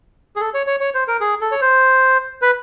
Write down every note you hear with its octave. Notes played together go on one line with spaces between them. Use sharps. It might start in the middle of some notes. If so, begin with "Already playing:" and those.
G#4
A4
C#5
C#5
C#5
C5
A#4
G#4
A4
C#5
C5
B4